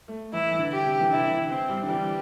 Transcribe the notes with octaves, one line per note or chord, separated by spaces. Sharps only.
A3
E3 E4
E3
D3
G4
C3
E3
D3 E4
D3
E3
C4
G3
D3
E3 G3